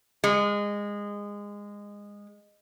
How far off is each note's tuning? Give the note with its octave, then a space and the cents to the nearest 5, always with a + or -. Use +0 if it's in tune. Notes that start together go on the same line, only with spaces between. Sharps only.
G#3 -20